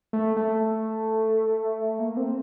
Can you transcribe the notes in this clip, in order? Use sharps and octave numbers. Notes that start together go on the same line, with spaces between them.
A3
A3
A#3
C4